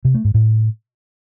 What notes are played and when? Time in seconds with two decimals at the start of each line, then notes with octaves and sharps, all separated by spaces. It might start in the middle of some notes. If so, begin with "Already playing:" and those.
0.05 C3
0.15 A3
0.24 G#2
0.34 A2